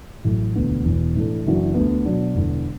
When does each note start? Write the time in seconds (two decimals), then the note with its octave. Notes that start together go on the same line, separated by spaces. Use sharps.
0.24 A1 A2 F#3 A3
0.55 E1 D2 D3 B3
0.85 E1 E2 B2
1.15 A2 E3 D4 A4
1.45 F#1 F#2 E3 D4 F#4
1.74 D2 D3 B3
2.05 B2 F#3 D4
2.35 E1 E2 D3